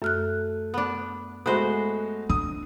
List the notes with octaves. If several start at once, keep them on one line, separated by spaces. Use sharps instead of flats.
F#2 A3 F6 F#6
B3 D4
G#3 A3 B3 F#4 C5
D4 D#6